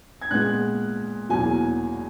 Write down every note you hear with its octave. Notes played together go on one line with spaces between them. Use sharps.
G#6
A#2 G#3 B3 F#6
E2 B2 F#3 A#3 G#5